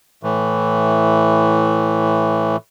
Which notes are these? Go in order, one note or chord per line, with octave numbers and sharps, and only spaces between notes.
A2 E3